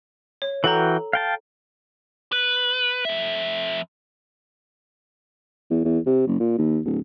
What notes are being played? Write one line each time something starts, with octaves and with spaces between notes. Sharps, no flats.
C#5
E3 F#4 A4 G5 A#5
F5 G5 A5
B4
F2 E5
E2
E2
C3
F#1
A#2
D#2
D1